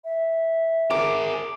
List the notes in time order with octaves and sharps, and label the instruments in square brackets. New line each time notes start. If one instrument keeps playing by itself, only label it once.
[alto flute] E5
[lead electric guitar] G#4 A#4 [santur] D6